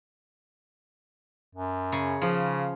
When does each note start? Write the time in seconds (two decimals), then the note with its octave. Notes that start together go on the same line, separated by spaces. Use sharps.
1.55 F#2
1.92 C#3
2.22 C#3 F3